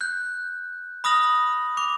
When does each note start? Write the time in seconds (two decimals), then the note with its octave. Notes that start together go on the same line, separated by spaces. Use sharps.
0.01 F#6 G6
1.04 B5 D#6 F6 A#6 F#7
1.77 D6 F7